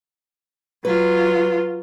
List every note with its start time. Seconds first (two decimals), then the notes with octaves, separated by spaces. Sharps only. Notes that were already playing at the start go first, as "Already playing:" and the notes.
0.85 F#3 F4 B4